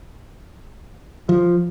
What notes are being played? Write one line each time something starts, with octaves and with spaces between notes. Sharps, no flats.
F3